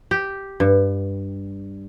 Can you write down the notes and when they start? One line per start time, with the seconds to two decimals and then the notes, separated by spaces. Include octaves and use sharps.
0.11 G4
0.60 G2